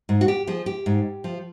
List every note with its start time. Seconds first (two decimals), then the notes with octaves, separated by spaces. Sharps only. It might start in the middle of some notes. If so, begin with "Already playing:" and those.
0.09 G#2
0.21 F#4
0.28 G4
0.47 F3 G#4
0.66 G4
0.86 G#2
1.24 F3